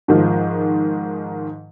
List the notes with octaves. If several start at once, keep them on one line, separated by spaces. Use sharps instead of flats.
G#2 D#3 F3